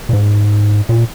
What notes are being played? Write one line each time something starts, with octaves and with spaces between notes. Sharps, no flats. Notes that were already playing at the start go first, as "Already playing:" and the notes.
A#2
G#2
A#2